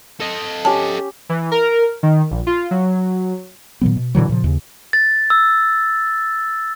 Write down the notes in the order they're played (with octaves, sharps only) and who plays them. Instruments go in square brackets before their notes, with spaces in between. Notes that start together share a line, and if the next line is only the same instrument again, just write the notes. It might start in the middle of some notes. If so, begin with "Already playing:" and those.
[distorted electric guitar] A4 D#5
[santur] C#4 G4 [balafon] A5
[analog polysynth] E3
A#4
D#3
A#1
F4
F#3
[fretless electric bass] A#2 D#3 F#3 B3
B2
A#2 D3 E3 F#3
A#2 C#3 F3
D#2 C#3
[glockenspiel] A6
E6